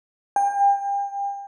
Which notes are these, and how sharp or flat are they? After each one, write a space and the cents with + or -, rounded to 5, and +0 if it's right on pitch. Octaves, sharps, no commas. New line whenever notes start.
G5 +35